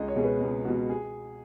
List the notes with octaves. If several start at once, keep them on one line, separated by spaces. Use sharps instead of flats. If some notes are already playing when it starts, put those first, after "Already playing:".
Already playing: C#2 D#5
C#5
B2 G#3 G#4
B4
C#2
B2 G#3 F#4
G#4